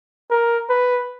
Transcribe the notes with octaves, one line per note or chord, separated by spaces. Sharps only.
A#4
B4